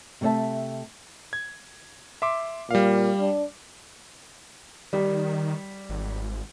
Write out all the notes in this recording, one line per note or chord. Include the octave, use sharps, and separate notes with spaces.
C3 A3 C#5 E5 A5
G#6
E5 C6 D6
A#2 G3 F5
D4
D#3 G3
G#1